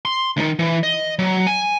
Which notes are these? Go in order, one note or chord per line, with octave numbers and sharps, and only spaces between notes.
C6
D2 D#3
E3
D#5
F#3
G#5